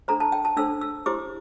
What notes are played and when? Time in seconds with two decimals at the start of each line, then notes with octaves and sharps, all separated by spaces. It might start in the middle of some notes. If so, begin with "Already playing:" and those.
0.08 D4 A4 C5 A#5
0.20 A5
0.32 G5
0.45 A5
0.57 D4 A4 C5 E6
0.81 E6
1.06 E4 G4 C5 D6